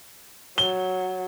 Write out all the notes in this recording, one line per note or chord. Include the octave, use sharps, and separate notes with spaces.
F#3 G7